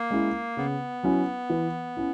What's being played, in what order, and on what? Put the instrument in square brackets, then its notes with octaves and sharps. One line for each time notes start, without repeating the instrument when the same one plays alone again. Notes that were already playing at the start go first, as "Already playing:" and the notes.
Already playing: [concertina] A#3
[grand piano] G#3 C#4 E4
[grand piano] C#3 [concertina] B3
[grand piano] F#3 C#4 E4
E3
C#4 E4